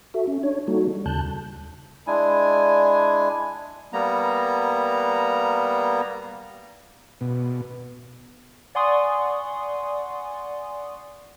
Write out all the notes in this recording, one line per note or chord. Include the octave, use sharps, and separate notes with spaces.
F#4 A4 E5
C#4
D4 C#5
G3 A#3 D#4 F#4 A4
G3
D#2 C#3 A5 F#6 G6
G#3 D4 E4 G#5
G3 A#3 B3 A#5
B2
D5 F#5 G#5 C6 C#6 D#6